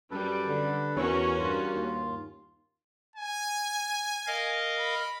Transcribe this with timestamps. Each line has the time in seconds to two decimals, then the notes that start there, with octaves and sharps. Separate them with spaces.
0.11 F#2 G3 A4 B4
0.47 D3
0.96 E2 C#4 F#4 A#4 C#5
1.39 G2 F4
1.74 D#2
3.16 G#5
4.27 A#4 D#5 F5
4.80 B5